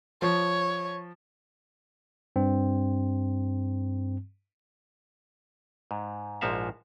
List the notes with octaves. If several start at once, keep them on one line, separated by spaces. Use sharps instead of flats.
F3 C#5
G2 C4
G#2
A#1 G#2 F3 F#4 E5 F5